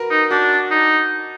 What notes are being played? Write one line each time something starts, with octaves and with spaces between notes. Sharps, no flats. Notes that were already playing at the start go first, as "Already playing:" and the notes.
Already playing: F#4 A#4 B4
D#4
D4 F#4
D#4